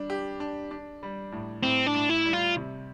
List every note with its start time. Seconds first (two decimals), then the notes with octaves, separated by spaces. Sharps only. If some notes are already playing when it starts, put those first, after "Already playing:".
Already playing: G3 D4
0.10 G4
0.40 D4
0.71 D4
1.03 G3
1.32 A2
1.63 A2 C4
1.86 D4
1.95 A2
2.09 E4
2.25 G3
2.33 F4
2.56 C3